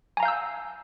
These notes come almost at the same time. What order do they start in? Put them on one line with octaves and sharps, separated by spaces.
G#5 A#5 F5 G6 E6